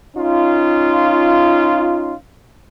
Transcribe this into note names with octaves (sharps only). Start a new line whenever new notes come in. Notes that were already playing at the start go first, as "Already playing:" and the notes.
C#4 D#4 F4